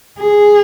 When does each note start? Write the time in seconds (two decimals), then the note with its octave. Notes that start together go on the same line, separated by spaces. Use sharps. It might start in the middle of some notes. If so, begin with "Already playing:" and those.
0.19 G#4